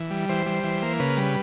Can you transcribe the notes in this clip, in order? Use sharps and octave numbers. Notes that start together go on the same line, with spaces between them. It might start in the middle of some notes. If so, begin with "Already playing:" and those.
Already playing: E3
G3
E3 C5
G3
E3
A#3
C#3 B4
G3